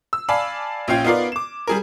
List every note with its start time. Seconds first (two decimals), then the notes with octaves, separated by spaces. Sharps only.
0.13 E6
0.29 D5 F5 G#5 A5 B5
0.88 A#1 C#4 F4 G5 G#6
1.04 B3 D#4 F4 A#4 D5
1.32 D6 E7
1.67 G3 G#4 A#4